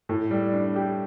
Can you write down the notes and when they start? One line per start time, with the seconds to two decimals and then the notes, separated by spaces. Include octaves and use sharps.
0.09 A2
0.31 G3
0.54 D4
0.76 G4